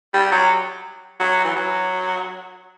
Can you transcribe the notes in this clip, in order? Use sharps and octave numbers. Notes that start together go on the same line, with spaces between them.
G3
F#3
F#3
E3
F#3